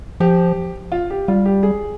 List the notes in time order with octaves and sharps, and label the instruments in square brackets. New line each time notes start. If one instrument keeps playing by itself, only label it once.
[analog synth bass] F3 [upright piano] G4
[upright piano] F4
G4
[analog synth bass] G3 [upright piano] F4
[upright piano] G4
G#4